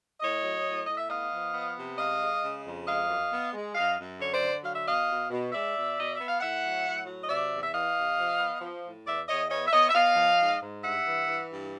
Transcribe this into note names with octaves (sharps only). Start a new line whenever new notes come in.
A2 C#5 D#5
F#3
A2
A2 D#5
E5
B3 D#5 F5
F3
B3
C3
G#3 D#5 F5
G#3
C#3
F2
G#3 D#5 F5
F#2
B3
G#3
F#2 D#5 F5
F#2
D3 C#5
C5 D5
D3
F#3 F5
E5
B2 D#5 F5
B2
B2
G#3 D5 E5
B2
B2 D#5
B3 E5
F5
A2 E5 F#5
F#3
A2
F#3
D#5
C3 D5 E5
E2
E5
E3 D#5 F5
C3
F3
B3
F3
A2
E2 D5 E5
E2 C#5 D#5
B3 C#5 D#5
E5
B3 C#5 D#5
E5
B3 D#5 F5
F3
G#2
G#2
G2 E5 F#5
E3
E3
G2